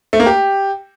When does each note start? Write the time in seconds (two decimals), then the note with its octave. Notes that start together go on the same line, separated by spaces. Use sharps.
0.13 A3
0.20 A#3
0.26 G4